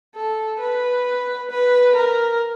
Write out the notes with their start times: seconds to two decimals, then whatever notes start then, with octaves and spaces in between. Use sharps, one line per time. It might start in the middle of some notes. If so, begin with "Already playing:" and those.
0.16 A4
0.60 B4
1.51 B4
1.96 A#4